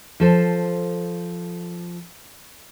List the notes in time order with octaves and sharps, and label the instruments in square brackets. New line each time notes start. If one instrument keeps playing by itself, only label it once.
[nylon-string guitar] F3 A4 C5